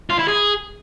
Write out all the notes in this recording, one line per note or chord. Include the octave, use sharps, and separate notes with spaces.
F4
E4
G#4